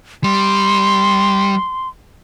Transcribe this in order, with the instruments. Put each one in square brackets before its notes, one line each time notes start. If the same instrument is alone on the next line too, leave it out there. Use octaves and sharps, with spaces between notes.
[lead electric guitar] G3 [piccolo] C6